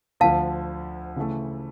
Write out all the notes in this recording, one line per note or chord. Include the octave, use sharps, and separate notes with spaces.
D2 D3 F3 F5 A5
C#3 E3 A3